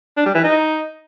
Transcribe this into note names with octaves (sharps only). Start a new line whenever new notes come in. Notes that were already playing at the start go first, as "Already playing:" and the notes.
D4
G3
E3
D#4